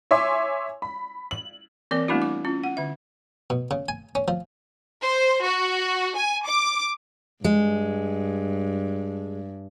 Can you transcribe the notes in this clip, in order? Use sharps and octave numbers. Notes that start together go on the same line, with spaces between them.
C#5 E5 G#5 C6 D6
B5
F#7
E3 A#3 C4 A#4 D5 D6
G3 A3 B3 D4 E4 F#4
D6
C#4 F4
F#5
D3 E5
B2
C#3
G#5
C#4
F3
C5
F#4
G#5
D6
G2 G#3